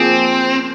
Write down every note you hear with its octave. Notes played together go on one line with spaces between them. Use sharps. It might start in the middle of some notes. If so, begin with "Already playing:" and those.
Already playing: F3 A#3 C4 G#4